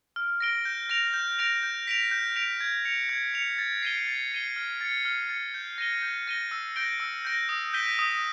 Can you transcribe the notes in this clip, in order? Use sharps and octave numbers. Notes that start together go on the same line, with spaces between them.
F6
A#6 D7 G7
G6
A#6 D7 F7
G6
A#6 D7 F7
G6
B6 D7 F7
G6
B6 D7 F7
G#6
C#7 F7
G#6
C#7 F7
A6
C7 D#7 G7
A6
C7 D#7 G7
F6
A6 C#7
F6
A6 C#7
G6
A#6 D#7 G7
G6
A#6 D#7 G7
E6
G6 A#6 D7 G7
E6
G6 A#6 D7 G7
D#6
G6 B6 D#7 G7
D#6